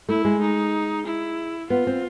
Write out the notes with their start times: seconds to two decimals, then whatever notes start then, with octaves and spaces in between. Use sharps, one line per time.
0.09 A3 E4
0.25 G#3
0.41 D#4
1.06 E4
1.70 B3 F4
1.87 C4